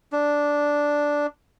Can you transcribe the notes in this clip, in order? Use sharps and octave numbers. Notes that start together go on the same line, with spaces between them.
D4